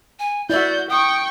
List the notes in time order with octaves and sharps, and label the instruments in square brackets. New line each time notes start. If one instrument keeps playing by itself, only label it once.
[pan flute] G#5
[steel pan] E4 E5 [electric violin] F#4 G6 [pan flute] D5
[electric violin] G5 C#6 [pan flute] D#6